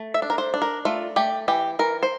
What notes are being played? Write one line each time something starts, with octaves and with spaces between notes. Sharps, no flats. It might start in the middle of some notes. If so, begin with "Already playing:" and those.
Already playing: A3
E5
D4
A#4
C5
D4
A#4
A3 F4
A3 G4
E3 G4
E3 A#4
C5